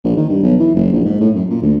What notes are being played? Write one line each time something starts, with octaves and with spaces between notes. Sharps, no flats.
A#1
D#3
G2
B1
E3
F#1
A#1
G#2
A2
F#2
A#2
D2